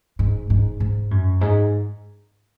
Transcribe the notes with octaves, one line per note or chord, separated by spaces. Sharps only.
G#2
G#2
G#2
F#2
G#2